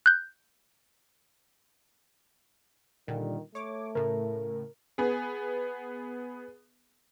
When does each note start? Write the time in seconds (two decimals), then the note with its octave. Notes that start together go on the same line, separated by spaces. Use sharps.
0.06 F#6 G6
3.08 A#2 D3 D#3 G3
3.55 A3 C#5 D6
3.95 A2 C#3 A#4
4.98 B3 G#4